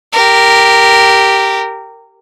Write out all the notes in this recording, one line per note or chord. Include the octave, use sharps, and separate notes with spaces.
G4 A#4